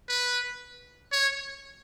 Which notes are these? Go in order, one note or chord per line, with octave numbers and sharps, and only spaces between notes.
B4
C#5